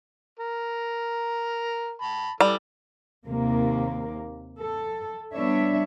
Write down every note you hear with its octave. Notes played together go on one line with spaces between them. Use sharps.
A#4
A5 B5
E3 G3 A4
D#2 C3 A#3
A4
G3 B3 D4 C#5 E5